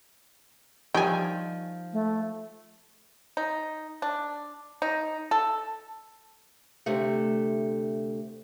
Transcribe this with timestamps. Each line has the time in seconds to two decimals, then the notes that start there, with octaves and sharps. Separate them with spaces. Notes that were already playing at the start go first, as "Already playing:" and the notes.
0.94 D#3 F3 G3 G5 G#5
1.93 A3
3.37 D#4
4.02 D4
4.82 D#4
5.31 A4
6.86 D2 C3 A3